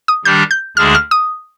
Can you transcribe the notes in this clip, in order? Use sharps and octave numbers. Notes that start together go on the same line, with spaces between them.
D#6
D#3 G3 D4 G4 G6
G6
D2 D3 G#3 D4 G#4 F6
F6
D#6